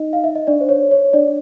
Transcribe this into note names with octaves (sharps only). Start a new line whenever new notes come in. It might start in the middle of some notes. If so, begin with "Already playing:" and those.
Already playing: D#4 D#5
F5
E5
D#5
D4 D5
C5
C#5
C#5
D4 D5